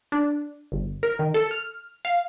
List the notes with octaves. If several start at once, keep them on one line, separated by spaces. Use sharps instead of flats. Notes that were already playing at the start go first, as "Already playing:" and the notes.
D4
G1
A#4
D#3
A4
F6
F5